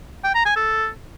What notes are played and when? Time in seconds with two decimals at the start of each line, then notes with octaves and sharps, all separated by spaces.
0.24 G5
0.35 A#5
0.46 G#5
0.56 A4